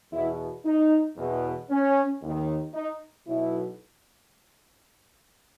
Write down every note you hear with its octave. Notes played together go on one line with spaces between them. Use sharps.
E2 B2 E4
D#4
E2 B2
C#4
D#2 D#3
D#4
B1 B2 E4